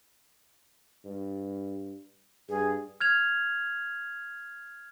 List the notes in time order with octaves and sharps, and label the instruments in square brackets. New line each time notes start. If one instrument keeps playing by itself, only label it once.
[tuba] G2
[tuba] G2 [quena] G#4
[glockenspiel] F6 G#6 F7